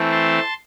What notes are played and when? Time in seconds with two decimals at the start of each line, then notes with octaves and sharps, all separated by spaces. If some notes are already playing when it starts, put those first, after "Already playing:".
Already playing: E3 A3 C4
0.11 A5 C6